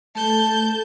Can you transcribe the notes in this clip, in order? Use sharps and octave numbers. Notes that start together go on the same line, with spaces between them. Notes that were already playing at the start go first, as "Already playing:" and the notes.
A3 A4 A5 G6